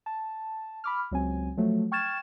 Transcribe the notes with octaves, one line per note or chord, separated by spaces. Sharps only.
A5
B5 D6 F6
C#2 F#3 C4 G#5
F3 F#3 A3
G5 C#6 F6 G#6 A6 E7